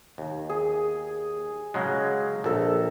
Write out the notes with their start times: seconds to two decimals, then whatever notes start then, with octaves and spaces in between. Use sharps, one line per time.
0.18 D#2
0.50 G#4
1.74 C#3 F#3 G#3
2.44 A#1 A4 A#4 A5